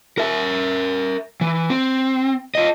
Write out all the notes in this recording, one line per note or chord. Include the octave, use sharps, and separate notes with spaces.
A#4 E5
E3
C4
F4 D#5